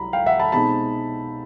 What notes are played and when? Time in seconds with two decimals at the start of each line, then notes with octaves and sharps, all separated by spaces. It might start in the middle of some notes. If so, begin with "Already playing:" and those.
Already playing: C2 F#3 A#5 B5
0.13 F5 G5
0.26 E5 F#5
0.40 A5 B5
0.52 B2 G#3 C4 D#4 A5 B5